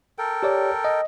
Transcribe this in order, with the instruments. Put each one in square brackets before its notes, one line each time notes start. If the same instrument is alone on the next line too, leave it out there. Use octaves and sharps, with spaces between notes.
[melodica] A4 A#4 G5
[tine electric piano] G4 C#5 D5
D#5